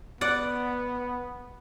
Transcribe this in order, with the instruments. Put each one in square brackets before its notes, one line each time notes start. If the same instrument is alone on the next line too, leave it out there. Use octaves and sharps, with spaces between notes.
[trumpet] B3 [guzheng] D5 F#5